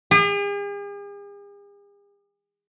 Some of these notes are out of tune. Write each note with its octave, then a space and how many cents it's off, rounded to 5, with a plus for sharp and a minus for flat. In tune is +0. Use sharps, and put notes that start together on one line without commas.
G#4 -45